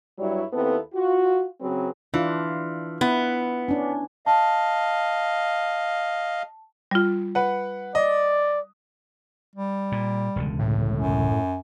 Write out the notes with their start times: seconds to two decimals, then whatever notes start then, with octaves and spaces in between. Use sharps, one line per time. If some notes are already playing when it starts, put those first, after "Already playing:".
0.19 G2 F#3 G3 E4 C#5
0.53 D#2 B3 C4 E4 A4
0.94 F4 F#4
1.61 C#3 F#3 C4 G#4 B4
2.14 E3 D4 F4
3.01 B3 E4
3.68 C#4 D4
4.26 D#5 F5 A5
6.91 G3 F4
7.35 B4 F#5
7.95 D5 D#5
9.56 G3
9.92 A#2
10.36 E1 C#2 D3
10.59 A2
10.96 F#2